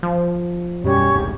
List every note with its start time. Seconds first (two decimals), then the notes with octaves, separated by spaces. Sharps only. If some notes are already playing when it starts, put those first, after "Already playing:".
0.03 F3
0.84 F#2 B2 G3 C#4 G4 C#5 C#6
1.14 E1 C2 G#2